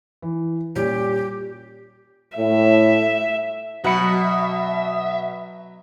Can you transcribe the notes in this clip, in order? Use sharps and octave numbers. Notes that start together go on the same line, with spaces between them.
E3
A#2 G3 C#4 G4
A2 E5
B2 F#3 E5 F#5 B5 C#7